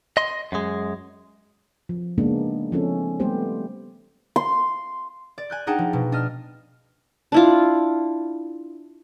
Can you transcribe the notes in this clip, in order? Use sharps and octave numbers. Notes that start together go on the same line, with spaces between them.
D#5 C6
F#2 G#3
F3
C#3 G#3 A#3 B3 D4 D#4
F3 C4 C#4 E4 A4
G3 A3 B3 G4 C5
C6
D5
G#5 F#6 G6
D4 D#4 G#4 F#5 G5 A5
F3
B2
D4 D#5 F6
D4 E4 F4